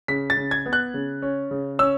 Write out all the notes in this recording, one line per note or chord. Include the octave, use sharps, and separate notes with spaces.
C#3 B6
A6
C#3
G#6
B3
F#6
C#3
C#4
C#3
C#4 E6